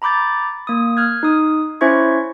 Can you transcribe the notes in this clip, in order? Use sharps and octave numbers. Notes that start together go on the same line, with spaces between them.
A#5 B5 D6 G6 A6
A#3 D#6
F6 F#6 G#6
D#4 D#6
C#4 E4 C5 E5 C#6 G#6